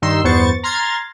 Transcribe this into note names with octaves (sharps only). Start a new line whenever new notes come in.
G2 D#3 D#4 C6 E6
E2 G2 B3 C5 C#6 A6
A#5 C6 F6 G#6 A6